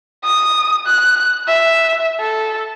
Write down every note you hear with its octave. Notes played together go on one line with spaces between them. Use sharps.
D#6
F#6
E5
A4